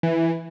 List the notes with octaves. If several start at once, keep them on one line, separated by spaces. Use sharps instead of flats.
E3